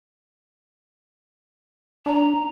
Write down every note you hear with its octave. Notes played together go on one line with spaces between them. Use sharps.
D4 A#5